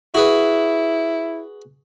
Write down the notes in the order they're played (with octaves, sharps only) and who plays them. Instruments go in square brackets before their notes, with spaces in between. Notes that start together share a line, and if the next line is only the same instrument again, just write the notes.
[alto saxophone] E4 [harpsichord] F#4 G#4 B4